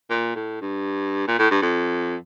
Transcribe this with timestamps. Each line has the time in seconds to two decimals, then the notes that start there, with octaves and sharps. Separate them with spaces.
0.10 A#2
0.35 A2
0.61 G2
1.27 A#2
1.39 A2
1.51 G2
1.62 F2